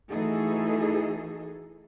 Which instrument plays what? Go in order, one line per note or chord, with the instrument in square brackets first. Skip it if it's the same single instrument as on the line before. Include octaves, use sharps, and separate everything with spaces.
[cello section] E3 A3 D#4 F#4 G#4 A4